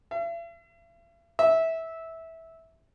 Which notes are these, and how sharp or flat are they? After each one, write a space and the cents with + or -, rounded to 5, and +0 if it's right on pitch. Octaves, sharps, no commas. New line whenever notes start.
E5 +45
E5 -15